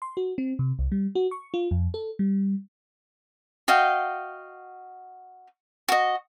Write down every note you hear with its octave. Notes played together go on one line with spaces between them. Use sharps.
C6
F#4
C4
C3
C2
G3
F#4
C#6
F4
F2
A4
G3
F#4 D#5 F5 G5
F#4 D#5